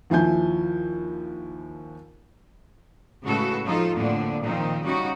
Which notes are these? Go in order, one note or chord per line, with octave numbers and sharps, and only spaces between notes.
D#2 F3 E4 G#5 G6
A2 C#3 G#3 F#4 A4 B4
F3 D#4 F4 A4
F2 A2 D3 F3 A#3 D4
A#2 D#3 F3 C4 D#4
C#3 G3 C#4 D#4 F#4